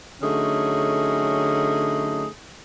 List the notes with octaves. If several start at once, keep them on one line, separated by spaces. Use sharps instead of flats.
D3 F#3 A3 C#4 D#4 G#4